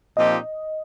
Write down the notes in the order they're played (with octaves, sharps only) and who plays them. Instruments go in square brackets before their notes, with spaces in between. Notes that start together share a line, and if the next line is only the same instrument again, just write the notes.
[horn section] A#2 F3 C4 D#4 G4 [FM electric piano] D#5